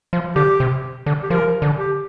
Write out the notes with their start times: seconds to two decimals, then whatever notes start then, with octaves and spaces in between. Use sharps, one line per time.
0.13 F3
0.36 D3 G4
0.60 C3
1.06 D3
1.23 G4
1.30 F3 A#4
1.62 D3
1.77 G4